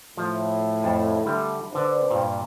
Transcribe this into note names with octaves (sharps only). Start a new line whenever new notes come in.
A2 F3
F2 A5
D3 G3 A3
D3 D4 B4 C5 D5
G2 A#2